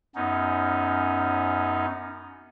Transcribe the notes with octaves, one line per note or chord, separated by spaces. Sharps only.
F#2 B3 C#4 D#4